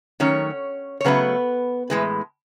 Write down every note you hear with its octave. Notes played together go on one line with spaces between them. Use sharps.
D#3 F#3 A3 C#4 C#5
C#5
C#3 F#3 A3 B3 B4
A2 E3 G#3 B4